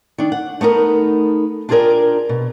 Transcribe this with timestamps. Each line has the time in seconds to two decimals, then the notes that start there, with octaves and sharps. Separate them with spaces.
0.18 D#3 D4
0.32 F#5
0.61 A3 B3 D#4 A#4
1.69 D4 F4 G4 G#4 A#4 D5
2.29 B2